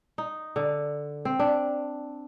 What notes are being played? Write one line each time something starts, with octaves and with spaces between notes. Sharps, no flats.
D#4
D3
C4
D4